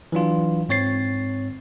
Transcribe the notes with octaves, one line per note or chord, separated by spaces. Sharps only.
E3 F#3 D4 F4
G#2 C4 C#5 A6 C7